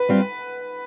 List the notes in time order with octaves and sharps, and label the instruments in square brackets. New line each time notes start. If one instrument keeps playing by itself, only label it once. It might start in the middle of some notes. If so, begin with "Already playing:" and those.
Already playing: [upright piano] B4
[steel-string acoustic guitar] G3 C4 F4